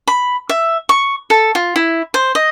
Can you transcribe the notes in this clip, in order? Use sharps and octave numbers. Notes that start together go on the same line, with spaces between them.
B5
E5
C#6
A4
F4
E4
C5
D#5